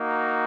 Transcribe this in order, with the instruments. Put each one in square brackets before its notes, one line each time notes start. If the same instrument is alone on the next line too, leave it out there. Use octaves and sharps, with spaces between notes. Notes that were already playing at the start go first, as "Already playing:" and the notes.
Already playing: [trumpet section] A#3 D#4 F#4